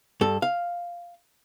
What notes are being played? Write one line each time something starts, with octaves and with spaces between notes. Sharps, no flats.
G2 A4
F5